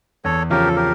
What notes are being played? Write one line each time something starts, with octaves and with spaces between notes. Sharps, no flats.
E2 A4 C#5
C#3 F3 C#4 F4 G4 A#4
A4
G4 A#4